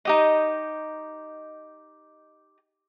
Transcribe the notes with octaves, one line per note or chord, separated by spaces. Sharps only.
D#4 G4 D#5